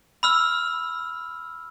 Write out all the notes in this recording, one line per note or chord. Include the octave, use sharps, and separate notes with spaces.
B5 E6 F6